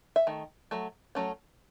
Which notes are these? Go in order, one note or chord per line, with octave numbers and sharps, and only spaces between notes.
E5
D#3 A3
F#3 A3
F#3 A3 C#4